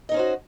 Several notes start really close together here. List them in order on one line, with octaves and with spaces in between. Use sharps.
D#5 D#4 C#4 C5 F#4